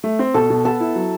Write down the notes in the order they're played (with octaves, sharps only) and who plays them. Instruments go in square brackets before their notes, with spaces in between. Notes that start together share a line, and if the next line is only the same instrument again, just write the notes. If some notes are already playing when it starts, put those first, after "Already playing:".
[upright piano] A3
C4
[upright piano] B2 [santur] A4
[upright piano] B2
[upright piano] B3 [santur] A4
[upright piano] E4
F#3